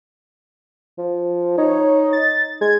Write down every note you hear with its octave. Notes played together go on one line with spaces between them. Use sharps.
F3
D#4 C#5
A6
G#3 G#6